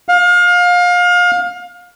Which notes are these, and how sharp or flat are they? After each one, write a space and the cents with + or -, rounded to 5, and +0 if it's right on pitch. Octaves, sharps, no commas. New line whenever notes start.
F5 +30